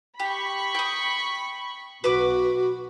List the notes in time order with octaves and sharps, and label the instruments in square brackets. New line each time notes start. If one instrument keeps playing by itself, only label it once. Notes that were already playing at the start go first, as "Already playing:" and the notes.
[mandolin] G4 [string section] B5 C#6
[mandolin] G5 D#6
[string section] B1 [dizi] F#4 [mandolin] B4 D6